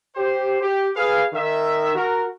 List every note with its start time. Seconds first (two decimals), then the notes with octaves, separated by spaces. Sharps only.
0.15 G4 C5
0.61 G4
0.96 G#4 B4 F5
1.33 D#3 E5
1.95 F#4 A#4